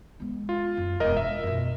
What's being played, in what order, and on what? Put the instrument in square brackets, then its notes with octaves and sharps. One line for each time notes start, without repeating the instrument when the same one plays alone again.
[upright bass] G#3 B3
[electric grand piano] F4
[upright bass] F#2
[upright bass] E1 G#3 [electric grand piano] A#4 D#5
[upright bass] D4 [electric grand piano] E5
[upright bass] F#2 B2